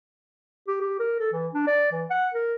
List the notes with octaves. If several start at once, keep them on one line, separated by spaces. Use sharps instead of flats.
G4
G4
A#4
A4
E3
D4
D5
E3
F#5
A#4